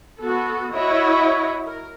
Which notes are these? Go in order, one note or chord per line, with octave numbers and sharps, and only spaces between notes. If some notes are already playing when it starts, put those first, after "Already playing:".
B3 F#4 A4
E4 F#4 C#5 D#5
A#4